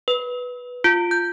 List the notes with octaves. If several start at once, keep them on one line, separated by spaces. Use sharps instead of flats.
B4
F4
G6